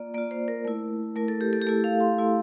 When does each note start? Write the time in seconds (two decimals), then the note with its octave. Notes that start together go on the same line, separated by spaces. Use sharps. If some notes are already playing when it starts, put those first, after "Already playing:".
Already playing: A#3 F4 D5
0.14 A#3 D5
0.18 F4
0.31 C5
0.48 A#4
0.65 A3 E4
1.16 A3 E4 A#4
1.28 A4
1.41 G4
1.53 A4
1.61 G4
1.67 A3 E4 A4
1.84 F5
2.00 C6
2.18 A3 E4